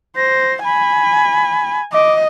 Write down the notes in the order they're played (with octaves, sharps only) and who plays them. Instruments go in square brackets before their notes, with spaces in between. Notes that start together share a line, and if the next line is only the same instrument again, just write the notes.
[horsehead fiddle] C5 [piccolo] A#6
[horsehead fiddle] G#5 [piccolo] B5
[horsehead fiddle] D#5 [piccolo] D6